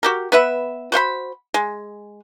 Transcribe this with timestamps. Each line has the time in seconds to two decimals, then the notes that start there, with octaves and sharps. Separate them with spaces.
0.03 F#4 G4 A#4
0.32 B3 B4 E5
0.92 F#4 C5 F5 B5
1.54 G#3